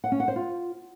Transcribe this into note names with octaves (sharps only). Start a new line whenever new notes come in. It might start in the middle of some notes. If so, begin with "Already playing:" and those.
F#5
C#4
F#5
C5
F4